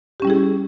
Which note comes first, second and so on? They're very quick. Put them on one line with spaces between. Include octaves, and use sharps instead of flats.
G4 C#4 G3 E4 G#4